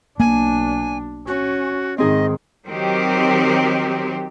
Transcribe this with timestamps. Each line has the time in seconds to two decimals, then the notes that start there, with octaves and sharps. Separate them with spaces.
0.20 B1 A#3 D4 G#5
1.27 C#4 F#4
1.98 G#2 D#3 C4 D#4 G#4 D#5
2.66 D#3 F#3 C4 G4